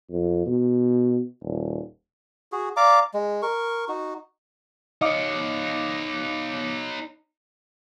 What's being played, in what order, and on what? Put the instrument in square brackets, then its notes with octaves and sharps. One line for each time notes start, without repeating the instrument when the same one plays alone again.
[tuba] F2
B2
D#1
[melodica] F#4 G#4
D5 F5 A#5 D6
G#3
A#4 C#6
D#4 F#4
[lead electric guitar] D#4 C#5 [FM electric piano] D#5 F5 D6